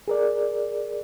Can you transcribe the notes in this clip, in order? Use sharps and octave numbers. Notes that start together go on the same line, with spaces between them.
G#4 A#4 D5